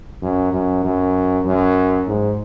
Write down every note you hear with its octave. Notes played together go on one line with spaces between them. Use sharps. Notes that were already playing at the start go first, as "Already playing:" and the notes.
F#2
F#2
F#2
F#2
G#2